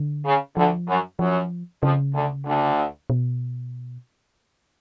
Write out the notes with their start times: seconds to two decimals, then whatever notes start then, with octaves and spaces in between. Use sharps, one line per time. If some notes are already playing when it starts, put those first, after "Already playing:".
Already playing: D3
0.25 C#3
0.56 D2 D3 F3
0.88 F#2 F#3
1.19 F#2 F3 F#3
1.82 F2 C#3 F3
2.14 D2 D3
2.45 D2 D3
3.10 B2